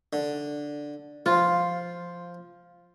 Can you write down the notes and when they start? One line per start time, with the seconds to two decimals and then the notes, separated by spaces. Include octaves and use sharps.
0.13 D3
1.26 F3 F4